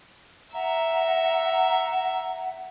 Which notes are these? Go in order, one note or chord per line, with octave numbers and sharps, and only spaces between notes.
E5 F#5 A#5